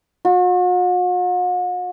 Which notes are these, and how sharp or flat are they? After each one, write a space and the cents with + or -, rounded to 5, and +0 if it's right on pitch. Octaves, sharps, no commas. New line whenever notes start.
F#4 -45